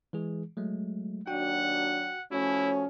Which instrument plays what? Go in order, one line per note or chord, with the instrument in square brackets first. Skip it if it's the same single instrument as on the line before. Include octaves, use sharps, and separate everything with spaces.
[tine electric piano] E3 G#3 G#4
F#3 G#3 A3
[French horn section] D#2 F#3 D4 [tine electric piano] F#4 G5 [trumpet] F#5
[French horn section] F3 A3 C#4 [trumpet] E4 [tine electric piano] F#4 C#5